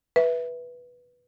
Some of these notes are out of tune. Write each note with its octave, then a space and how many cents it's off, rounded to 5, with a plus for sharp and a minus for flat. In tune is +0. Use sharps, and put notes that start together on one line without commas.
B4 -10 E5 +0